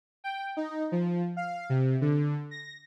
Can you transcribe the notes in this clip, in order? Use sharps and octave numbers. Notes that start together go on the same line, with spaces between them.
G5
D#4
F3
F5
C3
D3
A#6